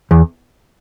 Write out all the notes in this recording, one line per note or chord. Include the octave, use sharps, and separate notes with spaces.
E2